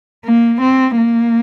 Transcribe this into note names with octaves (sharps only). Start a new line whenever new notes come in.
A#3
C4
A#3